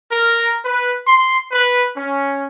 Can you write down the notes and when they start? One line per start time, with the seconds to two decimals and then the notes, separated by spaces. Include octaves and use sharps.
0.12 A#4
0.65 B4
1.07 C6
1.52 B4
1.97 C#4